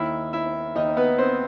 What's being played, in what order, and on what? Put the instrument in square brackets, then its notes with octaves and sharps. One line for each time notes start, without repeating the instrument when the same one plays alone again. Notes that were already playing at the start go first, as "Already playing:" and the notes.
Already playing: [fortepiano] D#2 D#3 E4 E5
E4 E5
D#2 D#3 D#4 D#5
B3 B4
C4 C5